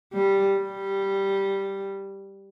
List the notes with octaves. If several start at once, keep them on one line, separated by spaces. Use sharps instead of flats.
G3
G3